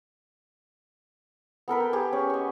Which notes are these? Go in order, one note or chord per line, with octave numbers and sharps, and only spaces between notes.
B3 A4 A#4 B5
G5
G4 G#4 B4
C#4
D#5 C#6